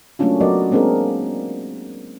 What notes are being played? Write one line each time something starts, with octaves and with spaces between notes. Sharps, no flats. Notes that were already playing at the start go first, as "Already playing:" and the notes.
F#3 A3 A#3 C#4 D4 F4
F#3 B3 A#4 D5 D#5
G#3 A#3 C4 D4 G#4 A#4